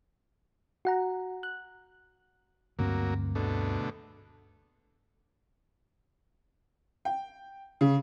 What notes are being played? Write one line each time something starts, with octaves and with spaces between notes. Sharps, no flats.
F#4 F#5 A#5
F#6
D2 G2 F#3 A#3 C4
B2 D3 A3
G5
C#3